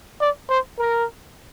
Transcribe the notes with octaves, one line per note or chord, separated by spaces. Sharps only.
D5
C5
A#4